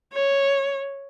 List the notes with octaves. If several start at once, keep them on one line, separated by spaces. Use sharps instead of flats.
C#5